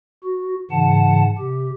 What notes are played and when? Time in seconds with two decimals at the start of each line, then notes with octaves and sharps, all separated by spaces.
0.24 F#4
0.71 G#2 C#3 E3 F#5 A5
1.38 C3 G4